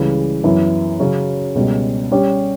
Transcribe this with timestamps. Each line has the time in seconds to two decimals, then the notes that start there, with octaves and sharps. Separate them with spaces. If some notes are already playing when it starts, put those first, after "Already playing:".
Already playing: C#2 C#3 E3 G3
0.44 F#2 E3 B3 E4
1.00 C#3 F#3 C#4
1.55 C#2 B2 G3 C#4
2.12 G3 C#4 G4 C#5